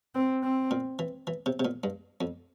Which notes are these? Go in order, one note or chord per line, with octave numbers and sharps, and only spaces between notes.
C4
C4
A#2
E3
E3
C3
C3
A#2
G2
F2